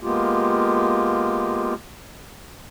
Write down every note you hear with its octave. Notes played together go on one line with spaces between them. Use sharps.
G#3 A#3 B3 F4 G4